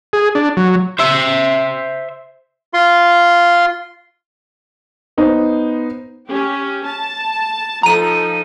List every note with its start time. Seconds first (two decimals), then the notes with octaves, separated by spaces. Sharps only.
0.13 G#4
0.35 D4
0.57 F#3
0.99 C5 E5
2.74 F4 C6
5.18 B3 D#4 C5
6.27 C#4 G4
6.85 A5
7.83 F3 D#4 A4 A#5 D#7